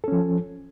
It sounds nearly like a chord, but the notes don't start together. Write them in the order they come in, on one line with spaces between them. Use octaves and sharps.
A4 C#4 F3